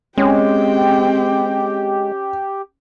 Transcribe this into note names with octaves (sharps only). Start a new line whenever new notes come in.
G#3 C4 C#4 G4 G5